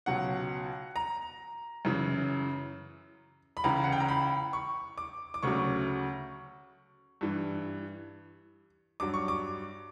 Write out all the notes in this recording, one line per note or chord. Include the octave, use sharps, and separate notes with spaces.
C#2 B2 F#3 F#5
A#5
F#2 C#3 E3
B5
C#2 C#3 E3 A#5
F#5
G5
A#5
B5
C#6
D6
D6
D2 C#3 F#3 C#6
G2 E3
G2 F#3 D6
C#6
D6